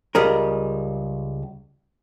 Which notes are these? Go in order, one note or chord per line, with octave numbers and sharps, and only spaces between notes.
C#2 G3 G#4 A#4